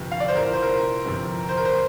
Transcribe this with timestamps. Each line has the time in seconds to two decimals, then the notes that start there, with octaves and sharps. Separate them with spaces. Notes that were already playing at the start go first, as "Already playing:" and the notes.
Already playing: G1 F2 C3
0.12 F5
0.20 D5
0.28 C5
0.35 C2 A#2 A#4
0.53 C5
0.62 A#4
1.05 G1 F2 C3
1.49 C5
1.57 A#4
1.65 C5